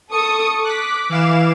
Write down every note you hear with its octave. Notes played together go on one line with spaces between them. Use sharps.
A4 C#6 D#6 C#7
D6 F#6 B6
E3 F5 E7